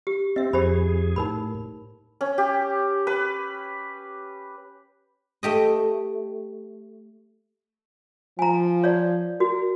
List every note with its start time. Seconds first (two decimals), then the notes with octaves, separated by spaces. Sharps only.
0.07 G4
0.36 C4 D#5 E5
0.53 F2 G4 G#4 C5 B5
1.16 A2 D#4 A#4 B5
2.21 C#4
2.38 G4
3.07 B4
5.43 A3 G4 D#5
8.39 F3 G#5 A#5
8.84 C#5 D5
9.40 F#4 A#4